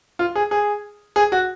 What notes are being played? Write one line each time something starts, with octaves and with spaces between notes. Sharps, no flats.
F4
G#4
G#4
G#4
F#4